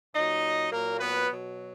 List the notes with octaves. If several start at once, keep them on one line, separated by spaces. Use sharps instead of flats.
A#2 F#3 D#4 D#5
A#2 F#3 A#3 A#4
B3 B4
B2 F#3